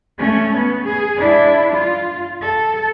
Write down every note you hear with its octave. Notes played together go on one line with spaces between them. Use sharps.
A3 C#4
B3
G#4
D4 E4
F4
A4